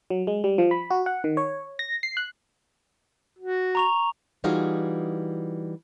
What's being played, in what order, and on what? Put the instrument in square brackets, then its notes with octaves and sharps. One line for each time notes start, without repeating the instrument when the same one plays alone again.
[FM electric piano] F#3
G#3
G3
F3
B5
F#4
F#5
D#3
C#5
A#6
C7
F#6
[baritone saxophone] F#4
[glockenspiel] A#5 C#6 F7
[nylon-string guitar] E3 G3 D#4 F4 F#4 G#4